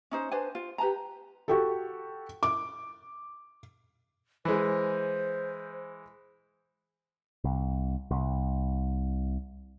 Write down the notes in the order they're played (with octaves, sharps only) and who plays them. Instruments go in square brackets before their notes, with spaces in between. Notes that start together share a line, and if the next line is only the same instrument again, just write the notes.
[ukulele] C#4 D#4 C5
D4 B4 C5 G#5
F4
G4 B4 A5 A#5
[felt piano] F#4 G4 A4
D6
[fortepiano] E3 G#3 [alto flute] C5
[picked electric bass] C2
C2